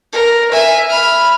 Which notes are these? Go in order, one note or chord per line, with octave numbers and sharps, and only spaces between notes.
A#4
E5 G#5
B5 F6